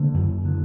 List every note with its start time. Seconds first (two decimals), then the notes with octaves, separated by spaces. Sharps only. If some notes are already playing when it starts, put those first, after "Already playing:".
Already playing: D3 A#3
0.14 F#2
0.45 D3